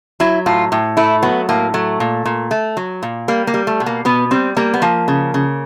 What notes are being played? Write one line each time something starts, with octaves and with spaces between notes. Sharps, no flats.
F#3 E4
A2 F4
A2
A3 E4
F#3 B3
A2 A#3
F#3 A3
A#2
A#2
A3
F#3
A#2
G3 A#3
A#3
G3
A3
B2
A#3
B2 B3
G3 C4
G3 A#3
B3
F3 A#3
C#3
C#3